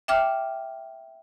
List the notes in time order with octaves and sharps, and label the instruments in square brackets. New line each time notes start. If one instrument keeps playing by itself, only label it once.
[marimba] E5 G5 D6 F6